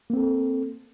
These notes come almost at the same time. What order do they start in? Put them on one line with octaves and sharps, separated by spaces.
A#3 C4 A4